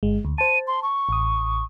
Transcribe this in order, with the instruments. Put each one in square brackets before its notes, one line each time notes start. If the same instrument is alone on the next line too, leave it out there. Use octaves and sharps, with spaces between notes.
[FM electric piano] G1 G#3
D2
[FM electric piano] C5 A5 [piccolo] D#7
[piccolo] C6
C#6
[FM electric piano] A1 D#6